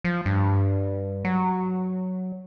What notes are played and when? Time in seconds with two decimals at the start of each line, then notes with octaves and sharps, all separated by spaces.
0.04 F3
0.26 G2
1.25 F#3